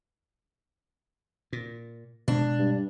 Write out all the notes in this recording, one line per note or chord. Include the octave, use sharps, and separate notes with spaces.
A#2
B2 G#3 D4
G2